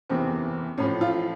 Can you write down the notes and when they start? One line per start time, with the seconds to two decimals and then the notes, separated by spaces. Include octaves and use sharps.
0.09 F#1 E2 C3 E3 C4
0.78 A1 A2 F3 C#4
1.01 F4